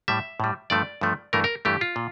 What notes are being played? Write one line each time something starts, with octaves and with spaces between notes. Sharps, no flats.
A2 G3 E5
A2 G3
G2 F3 A3 D5
G2 F3 A3
G2 E3 A3 A#4
A#4
G2 E3 A3 G4
F4
A#2